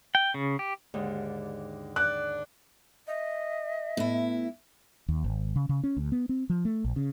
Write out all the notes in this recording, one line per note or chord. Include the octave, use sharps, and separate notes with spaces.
G5
C#3
G4
D#2 G#2 D3
D4 F#6
D#5 E5
A2 B3 E4
D#2
G#1
C#3
C#3
C#4
D2
B3
C4
F3
A3
A#1
C#3